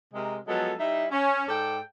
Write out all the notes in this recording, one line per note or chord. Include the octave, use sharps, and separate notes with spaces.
C3 G#3 A#4
F3 F#3 G#3 B3 A4
G3 D#4 E4 E5
C#4
G#2 A4 D5 G5